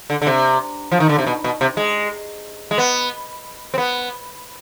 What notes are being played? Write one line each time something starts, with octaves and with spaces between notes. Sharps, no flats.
D3
D3
C3
F3
D#3
D3
C3
B2
B2
C3
G#3
G#3
B3
C4
B3